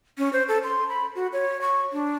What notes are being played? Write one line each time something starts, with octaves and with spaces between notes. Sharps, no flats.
C#4
C5
A4
C6
B5
F#4
C#5
C#6
D4